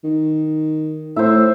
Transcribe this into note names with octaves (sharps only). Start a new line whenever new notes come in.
D#3
A2 C5 E5